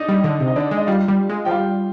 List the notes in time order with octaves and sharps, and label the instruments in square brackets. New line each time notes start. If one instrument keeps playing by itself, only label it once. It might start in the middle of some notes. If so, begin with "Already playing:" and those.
Already playing: [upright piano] D4 D#4 D5 D#5
[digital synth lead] G3
D3
C3
[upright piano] D#5
[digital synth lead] D3 [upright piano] D4 D5
[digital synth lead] G#3
[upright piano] D#5
[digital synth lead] G3 [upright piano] F4 F5
[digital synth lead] G3
G#3
[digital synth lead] F3 [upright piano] G5
[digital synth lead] G3 [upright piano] F4 F5